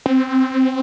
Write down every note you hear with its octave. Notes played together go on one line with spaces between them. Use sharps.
C4